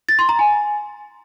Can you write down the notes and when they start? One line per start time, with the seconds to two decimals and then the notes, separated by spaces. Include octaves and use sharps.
0.09 A6
0.19 C6
0.29 A#5
0.39 G#5